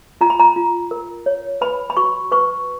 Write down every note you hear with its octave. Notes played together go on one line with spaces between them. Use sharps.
F4 A#5
B5
A#5
F4
A#4
C#5
B4 B5
B5
F#4 C#6
B4 C#6